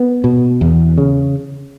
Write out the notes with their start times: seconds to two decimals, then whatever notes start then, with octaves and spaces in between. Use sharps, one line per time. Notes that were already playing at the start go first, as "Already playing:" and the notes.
Already playing: B3
0.24 B2
0.61 E2
0.98 C#3